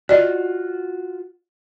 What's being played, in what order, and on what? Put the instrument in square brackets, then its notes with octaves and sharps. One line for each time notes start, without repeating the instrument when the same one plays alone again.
[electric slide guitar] F4 F#4 [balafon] D5 D#5